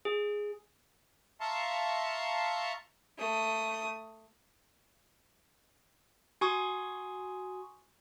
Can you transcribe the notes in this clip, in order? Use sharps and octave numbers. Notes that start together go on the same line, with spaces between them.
G#4
E5 F5 A5 A#5 C6 C#6
A3 D#6
F#4 G#5 C6 C#6 D#6